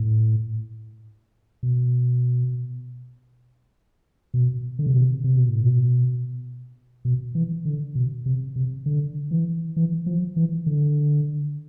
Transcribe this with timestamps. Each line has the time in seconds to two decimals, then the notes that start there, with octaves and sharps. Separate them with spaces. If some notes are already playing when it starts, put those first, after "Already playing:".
Already playing: A2
1.63 B2
4.34 B2
4.79 D3
4.86 C3
4.94 B2
5.02 C3
5.24 C3
5.37 B2
5.49 A2
5.62 B2
7.05 B2
7.35 E3
7.65 D3
7.95 B2
8.26 C3
8.56 C3
8.86 D3
9.31 E3
9.77 E3
10.06 F3
10.37 E3
10.66 D3